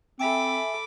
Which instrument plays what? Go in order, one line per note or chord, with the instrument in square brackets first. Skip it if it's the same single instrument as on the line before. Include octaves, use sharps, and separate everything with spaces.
[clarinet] C4 [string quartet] A4 B5 D6 [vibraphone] E5 G#5